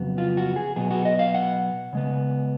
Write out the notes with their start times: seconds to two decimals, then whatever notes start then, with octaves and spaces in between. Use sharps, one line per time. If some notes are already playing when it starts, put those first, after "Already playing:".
Already playing: F2 C#3 F#3 B3
0.18 F4
0.37 F#4
0.56 G#4
0.76 B2 F#3 B3 G#4
0.91 F#4
1.05 D#5
1.19 F5
1.34 F#5
1.93 C#3 G#3 B3